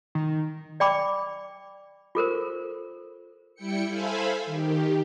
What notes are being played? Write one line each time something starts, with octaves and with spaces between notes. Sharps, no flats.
D#3
D5 G5 B5 D6
F4 A4 A#4 C5
G3 E4 G5 C#7
A4 C5 E5 F5 G#5 B5
D#3 G4